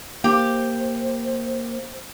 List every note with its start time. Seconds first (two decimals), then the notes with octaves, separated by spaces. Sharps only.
0.24 A#3 G4 C5